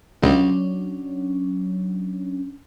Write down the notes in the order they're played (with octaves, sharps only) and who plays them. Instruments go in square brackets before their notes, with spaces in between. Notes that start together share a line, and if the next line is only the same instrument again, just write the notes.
[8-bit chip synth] C#2 [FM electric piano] F#3 C#4 D4